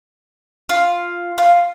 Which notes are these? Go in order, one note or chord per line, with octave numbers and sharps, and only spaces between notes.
F4
F4